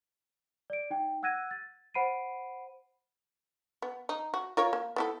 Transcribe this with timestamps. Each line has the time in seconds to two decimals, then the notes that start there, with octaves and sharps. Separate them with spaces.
0.70 D5 D7
0.90 D#4 G5
1.23 F#5 E6 F#6 G#6 A#6 D#7
1.51 A6
1.94 C5 F#5 B5 C7 D7 D#7
3.82 B3
4.09 D#4
4.34 F#4
4.57 F4 A#4 C#5
4.73 A#3
4.96 B3 E4 A4